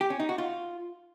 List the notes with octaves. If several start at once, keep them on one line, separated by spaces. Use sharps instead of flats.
G4
C#4
D#4
F#4
F4